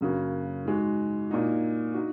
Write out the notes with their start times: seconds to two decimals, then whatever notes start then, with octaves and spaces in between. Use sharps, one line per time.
0.01 F#2 C#3 A#3 F#4
0.65 G#2 G#3 F#4
1.30 A#2 A#3 D#4 F#4
1.94 D#4 F#4